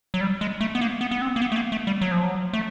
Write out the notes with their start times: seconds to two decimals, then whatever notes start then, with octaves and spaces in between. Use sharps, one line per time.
0.14 F#3
0.21 G3
0.41 G#3
0.61 A3
0.75 B3
0.81 A#3
1.01 B3
1.11 B3
1.22 C4
1.36 A#3
1.42 B3
1.52 A3
1.56 A#3
1.72 A3
1.87 G3
2.01 F#3
2.11 F3
2.23 F#3
2.53 A3